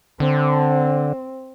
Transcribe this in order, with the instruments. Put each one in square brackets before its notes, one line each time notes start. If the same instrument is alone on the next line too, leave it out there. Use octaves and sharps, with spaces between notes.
[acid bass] D3 [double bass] C4